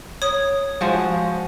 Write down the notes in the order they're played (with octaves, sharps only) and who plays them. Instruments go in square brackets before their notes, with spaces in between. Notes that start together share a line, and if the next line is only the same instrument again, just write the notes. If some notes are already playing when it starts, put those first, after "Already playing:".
[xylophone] C#5 D#6
[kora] F3 G#3 F#4